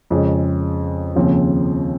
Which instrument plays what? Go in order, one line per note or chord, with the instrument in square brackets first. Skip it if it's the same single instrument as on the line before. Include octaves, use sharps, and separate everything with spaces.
[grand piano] F2 C#3 G#3
D#2 C#3 F3 C4